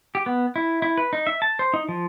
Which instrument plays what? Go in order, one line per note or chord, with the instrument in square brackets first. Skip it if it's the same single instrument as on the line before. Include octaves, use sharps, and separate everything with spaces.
[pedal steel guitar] G4
B3
E4
E4
B4
D#4
E5
A5
C5
D#4
F3